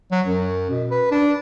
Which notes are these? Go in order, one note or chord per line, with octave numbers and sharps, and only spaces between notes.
F#3
F#2
B2
B4
D4